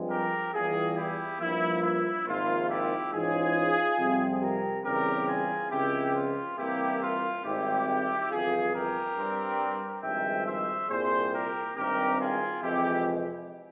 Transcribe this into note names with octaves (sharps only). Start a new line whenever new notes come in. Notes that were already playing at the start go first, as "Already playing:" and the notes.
Already playing: G2 F3 G#3 C4
G4 A#4
E2 E3 G3 F4 G#4
E4 G4
G2 F3 A#3 E4
E4
G#1 G#2 F3 A#3 F4
E4 G4
G#2 E3 G#3 C#4 F4 G#4
F2 C3 G3 C4
G4 A#4
E2 C#3 G3 C4 G4 A#4
F4 G#4
C#2 C#3 F3 C4 E4 G4
F4
C2 C3 E3 A#3 E4 G4
F4
G#1 G#2 G3 C4 E4 G4
G1 F2 E3 F4 G#4
G4 A#4
G2 G3 C4
G#1 G2 F3 G#3 E5 G5
C5 E5
C2 A#2 G3 G#4 C5
G4 A#4
G#1 G2 G3 C4 G4 A#4
F4 G#4
F2 C3 E3 G#3 E4 G4